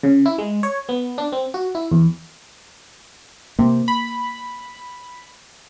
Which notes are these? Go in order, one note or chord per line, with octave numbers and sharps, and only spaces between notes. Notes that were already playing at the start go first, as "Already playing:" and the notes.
C#3
E4
G#3
C#5
B3
D4
C4
F#4
E4
E2
C3 A#3
B5